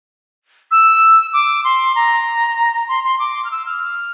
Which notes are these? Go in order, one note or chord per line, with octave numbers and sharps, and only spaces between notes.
E6
D6
C6
A#5
C6
C6
D6
F6
E6
F6